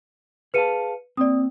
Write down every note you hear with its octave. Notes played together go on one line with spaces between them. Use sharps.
G#4 B4 F5 A5 C#7 D#7
A#3 C4 D5 D#6